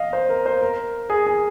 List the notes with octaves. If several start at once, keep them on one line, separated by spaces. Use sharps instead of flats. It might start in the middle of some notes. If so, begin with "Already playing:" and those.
Already playing: D#5 F5
C5
A#4
C5
A#4
G#4
G#4